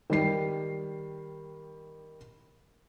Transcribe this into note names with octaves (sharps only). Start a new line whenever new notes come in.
D#3 G3 C7